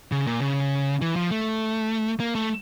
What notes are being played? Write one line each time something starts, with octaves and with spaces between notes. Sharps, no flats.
C#3
A#2
C#3
E3
F3
A3
A#3
A3